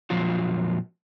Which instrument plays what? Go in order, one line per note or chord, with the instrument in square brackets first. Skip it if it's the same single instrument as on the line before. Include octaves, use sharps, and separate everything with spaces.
[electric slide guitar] F2 A#2 F3 F#3 F4